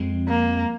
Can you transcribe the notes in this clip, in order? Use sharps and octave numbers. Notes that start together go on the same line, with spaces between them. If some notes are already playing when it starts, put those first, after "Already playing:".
Already playing: F2 F3 G#3 C4
A#3